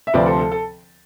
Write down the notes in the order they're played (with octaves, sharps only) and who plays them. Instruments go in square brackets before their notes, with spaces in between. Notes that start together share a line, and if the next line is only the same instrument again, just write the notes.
[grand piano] E5
D2 C3 F3 C4 B4 D5
A4 C5
A4
A4